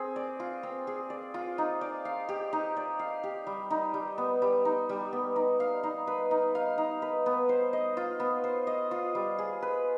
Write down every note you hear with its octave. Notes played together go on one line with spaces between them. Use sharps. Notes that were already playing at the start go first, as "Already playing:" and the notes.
Already playing: C4 G#4
D5
F4
C4
G#4
D5
F4
D#4
D5
F5
G4
D#4
D5
F5
G4
G3
D#4
G3
B3
G3
D#4
G3
B3
D#4
F5
D#4
B4
D#4
F5
D#4
B4
B3
C5
D#5
F4
B3
C5
D#5
F4
G3
G#4
B4